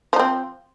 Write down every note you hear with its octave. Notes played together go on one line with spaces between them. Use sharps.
F3 C4 D#4